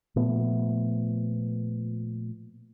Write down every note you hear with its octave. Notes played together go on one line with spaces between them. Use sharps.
A#2 F3 A3 B3